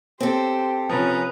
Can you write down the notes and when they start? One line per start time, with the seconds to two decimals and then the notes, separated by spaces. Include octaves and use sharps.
0.20 C4 G4 A4 C5
0.89 C3 F3 C#4 B4 A#5 D#6